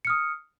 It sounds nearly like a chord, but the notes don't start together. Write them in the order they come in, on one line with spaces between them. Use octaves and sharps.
C#7 F6 D#6